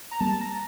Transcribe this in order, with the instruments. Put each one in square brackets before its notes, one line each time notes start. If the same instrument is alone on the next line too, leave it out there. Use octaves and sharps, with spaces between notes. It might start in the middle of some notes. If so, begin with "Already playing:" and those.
[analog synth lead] A#5
[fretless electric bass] G3 A#3 [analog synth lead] A5
[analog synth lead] A#5